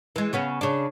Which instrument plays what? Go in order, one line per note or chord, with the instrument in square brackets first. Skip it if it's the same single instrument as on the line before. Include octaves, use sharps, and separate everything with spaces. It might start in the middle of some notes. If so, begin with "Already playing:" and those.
[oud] E3 G#3
C#3 B3 C#4
C#3 D4